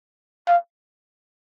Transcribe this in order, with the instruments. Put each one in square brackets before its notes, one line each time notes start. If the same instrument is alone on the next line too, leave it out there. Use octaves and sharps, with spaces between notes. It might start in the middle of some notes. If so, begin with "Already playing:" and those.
[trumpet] F5